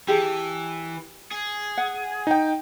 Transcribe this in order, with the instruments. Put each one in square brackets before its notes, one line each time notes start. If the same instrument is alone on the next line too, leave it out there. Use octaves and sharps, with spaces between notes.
[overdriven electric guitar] E3 [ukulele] G4 G#4 A5
[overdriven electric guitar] G#4
[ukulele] F#5
[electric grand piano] D#4 G5